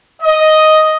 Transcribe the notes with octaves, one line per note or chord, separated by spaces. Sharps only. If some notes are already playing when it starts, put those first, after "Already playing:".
D#5